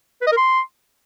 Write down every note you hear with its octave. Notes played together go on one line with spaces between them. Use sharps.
B4
D#5
A#4
C6